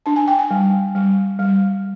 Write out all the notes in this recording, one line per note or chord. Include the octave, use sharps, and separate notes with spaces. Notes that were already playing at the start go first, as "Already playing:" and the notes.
D4 A5
G#5
G5
G#5
G3
G3
G3